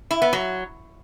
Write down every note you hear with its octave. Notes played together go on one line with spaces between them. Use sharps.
E4
B3
F#3